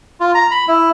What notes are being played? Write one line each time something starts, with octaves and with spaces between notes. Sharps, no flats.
F4
A#5
B5
E4